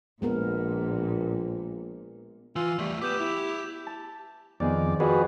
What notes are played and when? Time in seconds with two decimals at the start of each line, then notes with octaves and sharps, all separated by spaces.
0.22 A#1 A#2 G#3 B3 A#4
2.56 E3 F4 E6
2.79 E2 G3 A3
3.02 B3 G4 D6 G6 E7
3.19 E4
3.87 A5
4.60 F2 D#3 B3 G#4 D5
5.00 F2 F3 F#4 G#4 B4